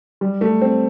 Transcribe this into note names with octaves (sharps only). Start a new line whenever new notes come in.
G3
A3
C4